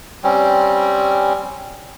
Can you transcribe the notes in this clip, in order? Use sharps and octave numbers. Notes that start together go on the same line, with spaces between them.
G3 C4 C#4